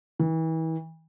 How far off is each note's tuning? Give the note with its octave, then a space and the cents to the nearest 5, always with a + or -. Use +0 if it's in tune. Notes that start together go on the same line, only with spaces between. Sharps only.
E3 -35